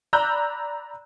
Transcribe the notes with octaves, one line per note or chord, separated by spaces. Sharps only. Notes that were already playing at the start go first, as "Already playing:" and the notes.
D5 A#5 B5 E6 F#6 G6